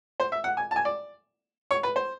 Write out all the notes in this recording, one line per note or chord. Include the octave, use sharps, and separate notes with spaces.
C5
E5
F#5
G#5
A5
G#5
D5
C#5
B4
C5